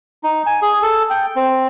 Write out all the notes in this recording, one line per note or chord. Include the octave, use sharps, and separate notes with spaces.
D#4
G#5
G#4
A4
G5
C4